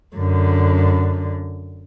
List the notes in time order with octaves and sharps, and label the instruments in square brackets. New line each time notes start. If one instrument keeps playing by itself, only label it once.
[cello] F#2 D3